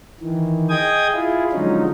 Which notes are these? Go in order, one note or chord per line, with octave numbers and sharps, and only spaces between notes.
D#3 E3
G#4 D#5 G5 D#6 G#6
E4 F4 G#4
D3 F3 F#3 G#3 C#4 D#4